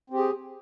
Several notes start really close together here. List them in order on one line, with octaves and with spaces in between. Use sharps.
C4 G4 G#4